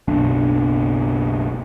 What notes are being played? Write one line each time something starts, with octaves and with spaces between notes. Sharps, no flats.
F#1 B1 D4